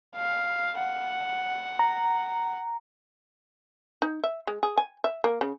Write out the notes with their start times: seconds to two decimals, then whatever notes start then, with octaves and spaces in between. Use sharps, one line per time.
0.16 F5
0.78 F#5
1.79 A#5
4.02 D#4
4.24 E5
4.47 G#3
4.63 G#4
4.78 G#5
5.04 E5
5.24 A#3
5.41 C#3